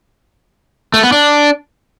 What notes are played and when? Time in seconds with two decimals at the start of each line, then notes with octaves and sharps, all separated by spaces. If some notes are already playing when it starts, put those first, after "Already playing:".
0.94 A3
1.03 B3
1.12 D4